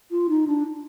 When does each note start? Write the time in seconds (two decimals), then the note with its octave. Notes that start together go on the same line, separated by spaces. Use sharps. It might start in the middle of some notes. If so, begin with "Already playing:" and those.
0.11 F4
0.29 D#4
0.47 D4